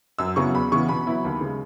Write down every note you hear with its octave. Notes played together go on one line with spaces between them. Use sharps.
F#2 E6
C#3 F#3 B3 E4 C#6
E2 B5
C#3 E3 B3 E4 C#6
B2 B5
F#3 B3 E4
D#2
C#3 G#3